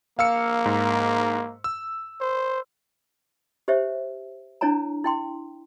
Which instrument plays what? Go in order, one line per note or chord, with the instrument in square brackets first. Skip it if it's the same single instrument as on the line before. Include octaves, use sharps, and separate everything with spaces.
[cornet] A#3 [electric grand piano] F5 E6 C#7
[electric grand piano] G#2
E6
[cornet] C5
[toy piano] G4 C5 C#5 E5
D4 E4 C#5 G#5 A#5
E4 G5 C6